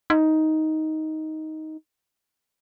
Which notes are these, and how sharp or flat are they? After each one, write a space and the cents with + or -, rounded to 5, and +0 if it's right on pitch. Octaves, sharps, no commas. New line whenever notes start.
D#4 +10